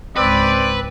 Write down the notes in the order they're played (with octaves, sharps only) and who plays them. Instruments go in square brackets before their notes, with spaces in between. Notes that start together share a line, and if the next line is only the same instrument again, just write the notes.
[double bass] C#2 G#2 [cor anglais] C4 [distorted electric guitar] B4 [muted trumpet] D5